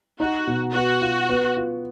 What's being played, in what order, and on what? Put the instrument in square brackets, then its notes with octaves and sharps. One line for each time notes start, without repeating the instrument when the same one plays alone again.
[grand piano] D#4 [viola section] F#4
[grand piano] B2
[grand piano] B3 [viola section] F#4
[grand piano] F4
B3
F4